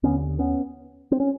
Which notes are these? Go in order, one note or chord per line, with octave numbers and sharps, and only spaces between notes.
D#2 D3 B3 C#4
B3 C#4
C4
C#4